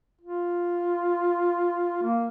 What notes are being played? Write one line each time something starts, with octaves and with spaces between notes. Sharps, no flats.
F4
A#3